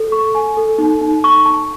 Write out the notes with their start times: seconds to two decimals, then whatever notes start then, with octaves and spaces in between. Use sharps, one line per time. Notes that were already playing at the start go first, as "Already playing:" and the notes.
Already playing: A4
0.12 C#6
0.35 G#5
0.57 A4
0.78 D#4
1.01 D#4
1.24 C#6
1.46 A5